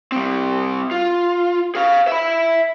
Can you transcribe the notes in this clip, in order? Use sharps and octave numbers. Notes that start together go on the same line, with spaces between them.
G3 C4
F4
G#4 F5
E5 B5